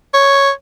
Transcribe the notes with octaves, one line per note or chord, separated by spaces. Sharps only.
C#5